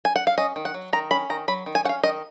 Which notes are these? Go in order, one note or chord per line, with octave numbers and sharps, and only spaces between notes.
G#5
F#5
F5
C#4 D#5
D#3
F#5
F#3
D#3 A#5
C#4 B5
D#3 A#5
F#3 B5
D#3
G#5
C#4 F5 F#5
D#3 D#5